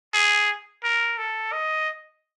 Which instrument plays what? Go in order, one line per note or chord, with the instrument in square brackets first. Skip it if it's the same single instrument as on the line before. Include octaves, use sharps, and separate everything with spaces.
[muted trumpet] G#4
A#4
A4
D#5